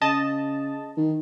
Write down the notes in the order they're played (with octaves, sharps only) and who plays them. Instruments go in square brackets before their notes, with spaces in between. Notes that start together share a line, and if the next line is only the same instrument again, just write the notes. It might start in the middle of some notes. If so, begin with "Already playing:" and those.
[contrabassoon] C#3 [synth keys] D#5 A5
[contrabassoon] D#3